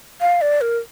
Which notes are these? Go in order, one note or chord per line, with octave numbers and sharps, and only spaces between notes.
F5
D5
A#4